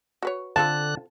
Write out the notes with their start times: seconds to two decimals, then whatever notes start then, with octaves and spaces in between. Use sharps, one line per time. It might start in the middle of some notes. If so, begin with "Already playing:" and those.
0.23 F#4 B4 C#5
0.56 D3 C4 F4 A4 A5 F#6